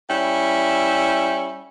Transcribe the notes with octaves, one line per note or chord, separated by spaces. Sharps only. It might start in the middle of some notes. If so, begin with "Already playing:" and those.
G3 C#4 E4